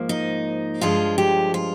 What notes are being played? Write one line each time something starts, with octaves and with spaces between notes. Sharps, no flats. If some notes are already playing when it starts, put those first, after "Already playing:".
Already playing: G#2 F3 A#3
D#4
G2 F3 G#3 F4
G4
F4